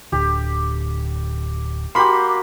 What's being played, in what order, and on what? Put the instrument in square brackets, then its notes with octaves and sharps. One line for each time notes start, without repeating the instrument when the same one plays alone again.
[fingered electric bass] D1 D3 [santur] G4
[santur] A#3 F#4 G4 [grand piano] B5 C6